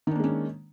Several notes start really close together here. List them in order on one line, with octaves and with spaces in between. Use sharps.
D#3 D4 A#3 G#3 C#4